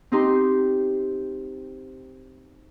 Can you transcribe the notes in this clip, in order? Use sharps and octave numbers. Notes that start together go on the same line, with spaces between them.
C4 D#4 G4 C6